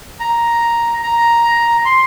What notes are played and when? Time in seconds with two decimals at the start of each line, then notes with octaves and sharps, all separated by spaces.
0.20 A#5
1.03 A#5
1.85 C6